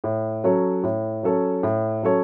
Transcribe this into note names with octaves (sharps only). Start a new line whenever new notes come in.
A2
F#3 C#4 A4 C#5
A2
F#3 C#4 A4 C#5
A2
F#3 C#4 A4 C#5